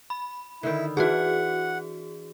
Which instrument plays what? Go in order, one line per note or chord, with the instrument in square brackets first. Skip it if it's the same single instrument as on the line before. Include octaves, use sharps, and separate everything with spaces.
[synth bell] B5
[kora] D3 D#3 [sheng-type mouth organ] E4
[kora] E3 D4 [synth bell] F#4 G#4 [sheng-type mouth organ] F#5